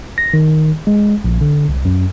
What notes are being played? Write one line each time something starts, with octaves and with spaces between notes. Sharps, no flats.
A#6
D#3
G#3
A#1
D3
C2
F#2